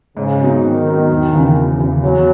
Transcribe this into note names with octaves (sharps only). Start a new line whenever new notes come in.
G#2 C#3
F#3 B3 D#4
G#2 D#3
F#3 B3 D#4
E1
E2 C#3 E3
E1
E2 C#3 E3
E2 F#3